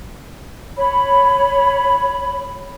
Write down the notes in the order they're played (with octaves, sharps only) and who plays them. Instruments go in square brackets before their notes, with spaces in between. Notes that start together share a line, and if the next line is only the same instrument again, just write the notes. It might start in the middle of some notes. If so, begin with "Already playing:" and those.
[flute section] C#5 B5